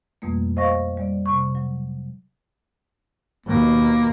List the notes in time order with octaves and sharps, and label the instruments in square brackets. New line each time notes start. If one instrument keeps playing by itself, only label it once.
[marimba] F2 B2 G3 A3 A#3
C5 D#5 F5 C#6 A#6
G3 D5
C3 C#6
F#3
[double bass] D#2 B2 [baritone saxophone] A#3